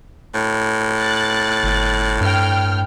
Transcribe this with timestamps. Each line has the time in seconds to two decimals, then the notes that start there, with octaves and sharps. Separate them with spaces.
0.34 A2
0.98 F#6 A6
1.63 G1
2.21 G2 G5 F6